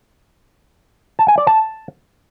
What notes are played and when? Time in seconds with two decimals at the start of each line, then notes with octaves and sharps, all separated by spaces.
1.19 A5
1.28 G#5
1.38 D5
1.47 A5